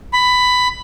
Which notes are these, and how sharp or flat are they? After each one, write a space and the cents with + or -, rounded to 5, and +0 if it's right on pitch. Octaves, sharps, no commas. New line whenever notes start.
B5 +15